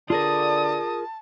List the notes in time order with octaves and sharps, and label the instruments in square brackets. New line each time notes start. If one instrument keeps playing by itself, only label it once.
[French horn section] D3 D5 [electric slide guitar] F4 G#4 A#4 [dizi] A5 [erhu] D#6